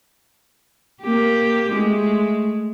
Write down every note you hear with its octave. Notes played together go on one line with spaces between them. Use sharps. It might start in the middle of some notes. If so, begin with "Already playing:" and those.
A#3 G4
G#3 A3